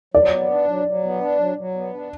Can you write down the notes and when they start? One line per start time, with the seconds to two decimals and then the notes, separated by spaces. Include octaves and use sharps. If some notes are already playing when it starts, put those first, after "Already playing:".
0.14 F#3 D5
0.32 B3
0.50 D4
0.68 F#3
0.86 F#3
1.03 B3
1.21 D4
1.39 F#3
1.57 F#3
1.75 B3
1.93 D4